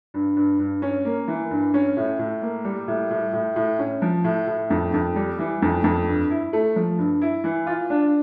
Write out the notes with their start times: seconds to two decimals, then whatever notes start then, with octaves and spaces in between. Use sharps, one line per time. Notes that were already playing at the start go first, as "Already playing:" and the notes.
0.14 G2
0.36 G2
0.59 G2
0.82 C#4
1.05 A#3
1.28 E3
1.51 G2
1.74 C#4
1.97 A2
2.19 A2
2.42 A#3
2.65 G3
2.88 A2
3.11 A2
3.33 A2
3.56 A2
3.79 C#4
4.02 F3
4.24 A2
4.47 A2
4.70 F2
4.94 F2
5.16 G3
5.39 E3
5.62 F2
5.84 F2
6.07 G2
6.30 E4
6.53 A3
6.76 F3
6.98 G2
7.22 E4
7.44 E3
7.67 F4
7.90 D4